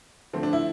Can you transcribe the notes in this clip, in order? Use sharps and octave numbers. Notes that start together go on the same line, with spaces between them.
D3 F3 A3 C4
D4
E4